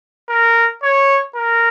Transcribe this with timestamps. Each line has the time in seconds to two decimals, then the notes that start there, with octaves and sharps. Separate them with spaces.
0.29 A#4
0.83 C#5
1.36 A#4